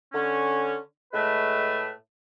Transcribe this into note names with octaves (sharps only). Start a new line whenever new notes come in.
D3 C#4
A2 G#3 A3 B4